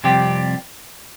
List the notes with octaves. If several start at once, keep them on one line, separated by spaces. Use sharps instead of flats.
F2 C3 G3 C4 G4